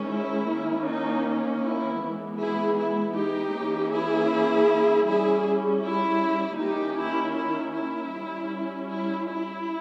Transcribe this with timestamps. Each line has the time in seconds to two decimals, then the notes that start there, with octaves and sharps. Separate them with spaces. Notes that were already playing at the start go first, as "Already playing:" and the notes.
Already playing: D#3 G#3 C#4
0.10 E4
0.48 D#3 A#3 C#4
0.86 D#4
1.63 E4
2.00 E3 G#3 B3
2.39 E4 G#4
2.78 E4
3.15 D#4 G4
3.54 E3 A#3 C#4
3.92 E4 G#4
5.07 G3 C#4 E4 G#4
5.84 E4
6.60 D#3 A#3 C#4 D#4 G4
6.99 E4
7.37 E4
7.76 E4
8.14 G3 C#4
8.89 E4
9.28 E4